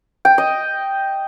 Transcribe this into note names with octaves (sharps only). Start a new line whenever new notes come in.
G5
D#5